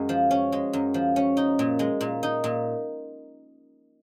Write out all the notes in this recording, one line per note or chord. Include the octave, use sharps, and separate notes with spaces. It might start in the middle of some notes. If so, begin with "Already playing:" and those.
Already playing: F#2 G#3
F3
C#4
G#3
F#2
F3
C#4
D#4
A#2
G#3
A#2
D#4
A#2